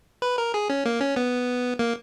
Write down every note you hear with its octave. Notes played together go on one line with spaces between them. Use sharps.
B4
A#4
G#4
C#4
A#3
C#4
B3
A#3